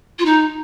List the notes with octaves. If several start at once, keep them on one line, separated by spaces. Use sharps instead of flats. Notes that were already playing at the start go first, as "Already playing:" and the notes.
F4
D#4